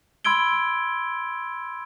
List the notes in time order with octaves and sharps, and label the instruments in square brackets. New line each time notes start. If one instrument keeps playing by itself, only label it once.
[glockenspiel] B5 C6 E6 G#6 D7 G7